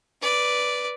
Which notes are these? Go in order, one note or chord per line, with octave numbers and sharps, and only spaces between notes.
B4 D5